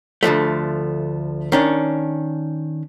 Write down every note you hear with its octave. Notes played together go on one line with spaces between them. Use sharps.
D2 D3 F3 A3
D#3 C#4 D4